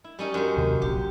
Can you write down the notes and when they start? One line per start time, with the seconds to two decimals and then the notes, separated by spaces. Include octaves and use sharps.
0.04 E4
0.19 G3 C#4 D#4
0.34 F#2 C5
0.57 D#2 C3 D#3
0.82 D1 A#1 G4